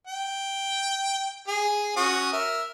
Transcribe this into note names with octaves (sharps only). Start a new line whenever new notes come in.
G5
G#4
C#4 F#4 D#6
A#4 E5